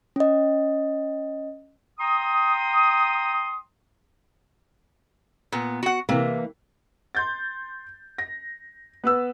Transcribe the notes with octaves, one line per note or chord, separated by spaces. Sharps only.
C#4 D#5
G5 A#5 C6 D#6
A#2 B3
F#4 F#5
C3 E3 A#3
C6 G6 A6
A#6
B3 B4 E6